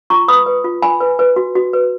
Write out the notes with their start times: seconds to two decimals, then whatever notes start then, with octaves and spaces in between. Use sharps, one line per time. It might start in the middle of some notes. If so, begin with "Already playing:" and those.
0.10 F4 A#5 C#6
0.28 B4 B5 D#6
0.46 B4
0.64 F4
0.82 F4 G#5 B5
1.00 B4
1.19 B4
1.36 F#4
1.55 F#4
1.73 B4